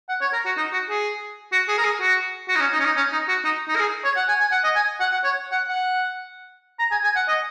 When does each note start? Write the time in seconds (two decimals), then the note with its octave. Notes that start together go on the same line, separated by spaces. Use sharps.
0.09 F#5
0.21 C#5
0.33 A#4
0.45 F#4
0.57 D#4
0.73 F#4
0.89 G#4
1.52 F#4
1.68 G#4
1.78 A#4
1.84 G#4
2.01 F#4
2.48 F#4
2.55 D#4
2.61 C#4
2.72 D#4
2.79 C#4
2.85 D#4
2.96 C#4
3.12 D#4
3.28 F#4
3.44 D#4
3.68 D#4
3.76 A#4
3.80 G#4
4.04 C#5
4.16 F#5
4.28 G#5
4.40 G#5
4.51 F#5
4.64 D#5
4.75 G#5
5.00 F#5
5.12 F#5
5.24 C#5
5.52 F#5
5.68 F#5
6.79 A#5
6.91 G#5
7.04 G#5
7.15 F#5
7.28 D#5